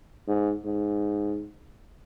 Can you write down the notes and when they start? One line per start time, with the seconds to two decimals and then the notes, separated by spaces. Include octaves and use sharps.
0.28 G#2
0.65 G#2